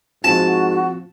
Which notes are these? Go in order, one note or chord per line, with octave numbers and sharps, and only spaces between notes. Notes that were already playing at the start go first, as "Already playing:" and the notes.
G#2 F3 C4 F4 F#4 A5